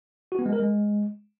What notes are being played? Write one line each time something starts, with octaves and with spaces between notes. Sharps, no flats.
F#4
B3
G#3
A#4
G#3